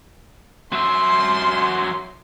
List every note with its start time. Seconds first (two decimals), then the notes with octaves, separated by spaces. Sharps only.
0.73 F#3 E5 C6